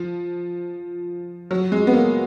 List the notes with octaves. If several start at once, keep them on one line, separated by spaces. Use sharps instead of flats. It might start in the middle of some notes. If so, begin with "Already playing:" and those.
Already playing: F3
F#3
G#3
B3
A#3